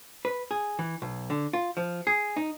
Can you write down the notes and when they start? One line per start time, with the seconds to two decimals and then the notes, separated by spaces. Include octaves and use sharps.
0.25 B4
0.51 G#4
0.79 E3
1.02 B1
1.30 D3
1.53 F4
1.77 F3
2.07 G#4
2.37 D#4